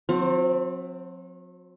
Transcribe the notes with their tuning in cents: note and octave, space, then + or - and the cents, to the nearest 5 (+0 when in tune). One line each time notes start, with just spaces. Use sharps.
F#3 -45 C4 +0